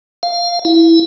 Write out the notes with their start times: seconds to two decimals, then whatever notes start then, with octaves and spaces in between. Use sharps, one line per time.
0.23 F5
0.65 E4